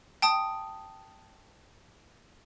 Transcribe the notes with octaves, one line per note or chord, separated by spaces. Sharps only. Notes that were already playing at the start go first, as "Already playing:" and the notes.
G5 A5 D#6